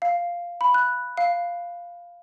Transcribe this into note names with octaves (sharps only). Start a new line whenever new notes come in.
F5
B5
F#6
F5